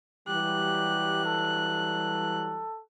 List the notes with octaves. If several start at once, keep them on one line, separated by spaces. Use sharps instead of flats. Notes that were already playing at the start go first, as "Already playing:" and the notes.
E3 F#3 G3 G4 F#6
A4